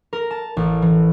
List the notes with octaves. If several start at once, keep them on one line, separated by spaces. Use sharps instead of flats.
A#4
A5
A1
E3